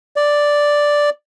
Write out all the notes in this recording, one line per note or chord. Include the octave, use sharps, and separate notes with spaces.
D5